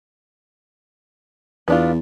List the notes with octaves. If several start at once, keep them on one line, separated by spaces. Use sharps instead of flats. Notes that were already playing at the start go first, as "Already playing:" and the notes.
E2 B3 D4 F4